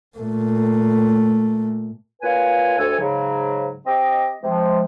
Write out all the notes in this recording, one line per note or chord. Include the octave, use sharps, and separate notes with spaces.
A#2 A3
A#2 F4 B4 C#5 G#5
D2 C3 A4 C#5 G#5
G#2 C#3 F#3
C4 G4 D#5
C3 F3 G#3